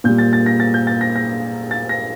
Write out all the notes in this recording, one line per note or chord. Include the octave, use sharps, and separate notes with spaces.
A#2 G3 G6
A6
A6
A#6
A6
G6
A6
A#6
A#6
A6
A#6